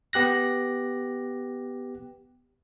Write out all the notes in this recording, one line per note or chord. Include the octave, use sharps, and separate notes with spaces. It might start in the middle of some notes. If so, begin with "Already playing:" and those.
B3 G4 F#6 A#6